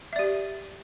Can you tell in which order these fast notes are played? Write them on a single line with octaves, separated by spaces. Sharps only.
E5 D5 G4